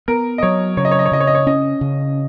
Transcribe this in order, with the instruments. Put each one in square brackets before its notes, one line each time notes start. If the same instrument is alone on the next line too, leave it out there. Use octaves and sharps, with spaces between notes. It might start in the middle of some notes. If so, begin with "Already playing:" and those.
[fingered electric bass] B3 [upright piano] A#4
[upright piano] D#5
[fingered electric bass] F#3 [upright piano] C#5
[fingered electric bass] C#3 [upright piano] C#5
[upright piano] D#5
C#5
D#5
C#5
[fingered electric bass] C#3 [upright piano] D#5
[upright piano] C#5
D#5
C#5
[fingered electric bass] C#4 [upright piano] D#5
[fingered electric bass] C#3